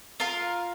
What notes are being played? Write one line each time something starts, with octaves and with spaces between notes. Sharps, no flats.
F4 A#4 F5